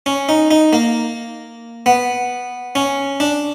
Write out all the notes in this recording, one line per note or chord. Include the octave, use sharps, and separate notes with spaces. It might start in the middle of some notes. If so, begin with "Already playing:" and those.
C#4
D#4
D#4
A#3
B3
C#4
D4